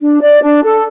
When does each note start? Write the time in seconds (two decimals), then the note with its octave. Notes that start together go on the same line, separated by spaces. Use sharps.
0.01 D4
0.21 D5
0.43 D4
0.63 A4